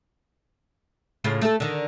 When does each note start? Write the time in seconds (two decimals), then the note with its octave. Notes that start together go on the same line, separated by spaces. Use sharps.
1.24 A2 C#3 F4
1.41 A3 A4
1.60 D3 D#3